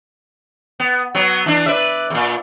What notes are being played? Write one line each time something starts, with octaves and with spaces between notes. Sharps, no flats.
B3
F#3 B3
E3 D4
B4 D5 E5
E2 A#2